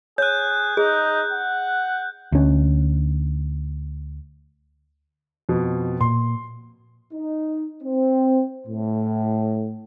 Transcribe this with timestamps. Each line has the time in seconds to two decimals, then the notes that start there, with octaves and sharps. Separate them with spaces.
0.18 G#4 C#5 F#6 G6
0.77 D#4 G#4
1.32 F#5
2.32 D2 C#4
5.49 F2 B2
6.01 A#2 C6
7.13 D#4
7.83 C4
8.67 A2